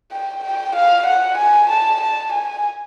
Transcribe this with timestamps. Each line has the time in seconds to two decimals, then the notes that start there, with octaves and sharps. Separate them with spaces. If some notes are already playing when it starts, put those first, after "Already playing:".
0.12 G5
0.43 G5
0.75 F5
1.06 F#5
1.37 G#5
1.69 A5
2.01 A5
2.32 G#5